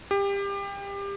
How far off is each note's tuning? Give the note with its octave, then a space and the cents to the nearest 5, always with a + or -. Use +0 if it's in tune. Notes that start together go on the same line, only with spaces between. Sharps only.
G4 +25